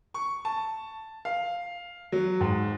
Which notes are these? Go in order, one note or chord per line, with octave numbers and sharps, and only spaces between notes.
C#6
A5
F5
F#3
G#2